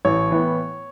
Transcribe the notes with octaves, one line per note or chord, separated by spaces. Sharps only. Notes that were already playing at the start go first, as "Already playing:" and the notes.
A1 C#5
A2 E3 B3